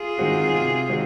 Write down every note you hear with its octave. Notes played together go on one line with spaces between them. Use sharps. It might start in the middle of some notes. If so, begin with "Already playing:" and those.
Already playing: F4 G#4
D#3 G#3 C4 F#4
C3
D#3 G#3 C4 F#4